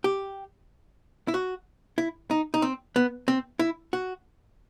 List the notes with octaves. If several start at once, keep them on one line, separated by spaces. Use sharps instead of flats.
G4
E4
F#4
E4
D#4
D#4
C4
B3
C4
E4
F#4